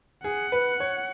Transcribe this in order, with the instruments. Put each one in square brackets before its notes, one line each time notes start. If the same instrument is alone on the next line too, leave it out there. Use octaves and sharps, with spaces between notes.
[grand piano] G#4 [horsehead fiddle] F#5
[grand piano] B4
C#5